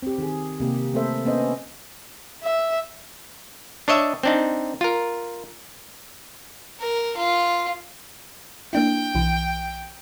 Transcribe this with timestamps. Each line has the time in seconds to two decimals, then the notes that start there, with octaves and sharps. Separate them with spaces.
0.03 C4 G4
0.18 D#3 G#4
0.60 C3 A#3 G4
0.94 A3 A#3 C4 A4 C5 E5
1.25 A#3 B3 C#4 C5 D#5
2.42 E5
3.88 D4 C#5 D#5 E5
4.23 C4 D4 D#4
4.81 F4 A#4
6.81 A#4
7.17 F4
8.73 A#3 D4 E4 G5
9.15 B1 E3